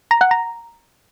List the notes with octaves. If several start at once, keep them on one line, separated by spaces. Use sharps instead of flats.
A#5
F#5
A#5